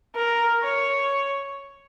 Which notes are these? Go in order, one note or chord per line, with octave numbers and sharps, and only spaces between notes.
A#4
C#5